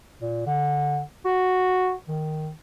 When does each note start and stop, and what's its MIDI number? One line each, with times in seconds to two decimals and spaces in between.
0.21 0.46 46
0.46 1.00 50
1.25 1.92 66
2.08 2.50 51